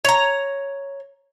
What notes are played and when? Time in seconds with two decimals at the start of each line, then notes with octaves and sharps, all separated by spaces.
0.05 C#5 A#5